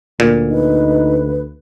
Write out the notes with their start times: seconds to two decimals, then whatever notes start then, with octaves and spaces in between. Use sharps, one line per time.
0.20 D2 A#2
0.50 D#4 B4